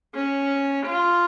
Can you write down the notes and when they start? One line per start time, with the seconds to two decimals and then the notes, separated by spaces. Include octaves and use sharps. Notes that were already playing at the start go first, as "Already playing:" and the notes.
0.15 C#4
0.86 F4